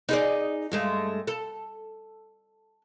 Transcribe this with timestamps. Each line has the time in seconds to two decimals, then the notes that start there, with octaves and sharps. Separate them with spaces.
0.09 D#4 G#4 D5
0.72 G2 G#3 A3
1.27 A4